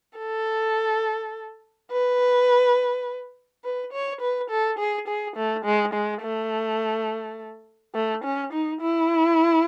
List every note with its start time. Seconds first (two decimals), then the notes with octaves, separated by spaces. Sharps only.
0.18 A4
1.91 B4
3.64 B4
3.93 C#5
4.21 B4
4.50 A4
4.79 G#4
5.08 G#4
5.36 A3
5.65 G#3
5.94 G#3
6.22 A3
7.94 A3
8.24 C#4
8.53 D#4
8.81 E4